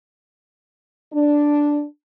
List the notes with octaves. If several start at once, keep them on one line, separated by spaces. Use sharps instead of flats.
D4